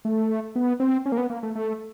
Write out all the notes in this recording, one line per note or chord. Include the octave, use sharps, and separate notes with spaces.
A3
B3
C4
C#4
A#3
B3
A#3
A3
A3